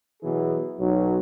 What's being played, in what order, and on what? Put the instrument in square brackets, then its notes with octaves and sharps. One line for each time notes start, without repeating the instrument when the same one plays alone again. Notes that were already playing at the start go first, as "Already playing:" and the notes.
[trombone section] B2 E3 F#3 G#4
B1 F#3